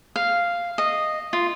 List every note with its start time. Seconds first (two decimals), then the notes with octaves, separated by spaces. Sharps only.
0.16 F5
0.78 D#5
1.33 F4